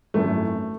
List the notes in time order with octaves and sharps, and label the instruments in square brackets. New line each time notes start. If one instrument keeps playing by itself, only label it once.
[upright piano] G#1 F#2 E3 A3